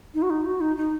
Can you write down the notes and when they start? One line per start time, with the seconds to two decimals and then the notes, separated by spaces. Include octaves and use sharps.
0.14 D#4
0.22 F#4
0.30 D#4
0.45 F#4
0.60 D#4
0.77 D#4